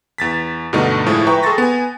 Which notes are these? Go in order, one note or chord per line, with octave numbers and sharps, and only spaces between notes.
E2 A6 B6
G2 B2 D3 A3 D#4 F#4
A2 F3 G#3 E4 G#4
B4 E5 G5 A#5 C#6
G#4 A4 C6 C#6 A6 A#6
B3 G#5